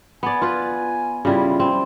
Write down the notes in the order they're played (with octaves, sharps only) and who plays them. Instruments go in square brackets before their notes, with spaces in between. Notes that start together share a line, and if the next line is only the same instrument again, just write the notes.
[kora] B3 D5 [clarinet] G#5
[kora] F4 B4
[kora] C#3 G3 E4 [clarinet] F4
[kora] C4